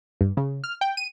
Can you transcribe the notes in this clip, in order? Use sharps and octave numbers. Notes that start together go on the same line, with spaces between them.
G2
C#3
F6
G5
D#7